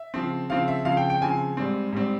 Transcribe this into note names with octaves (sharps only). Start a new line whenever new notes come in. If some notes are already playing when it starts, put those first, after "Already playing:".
Already playing: E5
C#3 F3 C4
C#3 F3 C4 F5
E5
C#3 F3 C4 F5
G5
G5
C#3 F3 C4 G#5
G#2 G3 C4
G#2 G3 C4